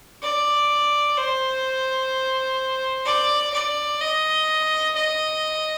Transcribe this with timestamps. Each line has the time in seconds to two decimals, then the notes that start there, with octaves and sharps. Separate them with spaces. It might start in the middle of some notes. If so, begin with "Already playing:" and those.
0.23 D5
1.17 C5
3.06 D5
3.54 D5
4.01 D#5
4.95 D#5